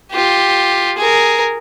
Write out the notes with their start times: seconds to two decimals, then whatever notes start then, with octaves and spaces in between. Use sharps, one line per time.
0.11 F4 G4
0.97 G#4 A#4